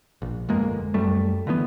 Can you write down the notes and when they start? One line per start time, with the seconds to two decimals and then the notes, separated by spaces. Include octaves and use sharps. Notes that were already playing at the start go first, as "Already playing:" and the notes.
0.22 A#1
0.49 G1 F2 G#3 A#3
0.94 F#2 G3 A3
1.47 D3 E3 G3 B3